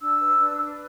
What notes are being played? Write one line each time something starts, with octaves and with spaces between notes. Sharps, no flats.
D4 E6
B4
D4
B4